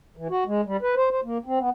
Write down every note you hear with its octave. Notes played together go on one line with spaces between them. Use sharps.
E3
F#4
G#3
G3
B4
C5
C5
A#3
C4
B3